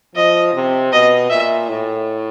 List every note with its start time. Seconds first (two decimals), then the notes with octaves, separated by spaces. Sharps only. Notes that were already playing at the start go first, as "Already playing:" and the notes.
0.15 F3 D#5
0.54 C3
0.92 B2 D#5
1.30 A#2 E5
1.69 A2